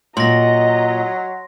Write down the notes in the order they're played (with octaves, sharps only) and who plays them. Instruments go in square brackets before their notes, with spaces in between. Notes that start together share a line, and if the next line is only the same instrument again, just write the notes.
[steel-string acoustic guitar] A#2 [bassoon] F#3 [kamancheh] D#5 A#5 [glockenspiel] C6 A#6